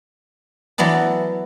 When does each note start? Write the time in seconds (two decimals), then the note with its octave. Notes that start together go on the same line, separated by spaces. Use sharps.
0.78 E3 F#3 B3 D5 A5